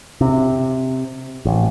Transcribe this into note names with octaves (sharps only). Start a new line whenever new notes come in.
C3
A1